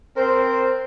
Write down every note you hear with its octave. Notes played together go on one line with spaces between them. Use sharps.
C4 A#4 C5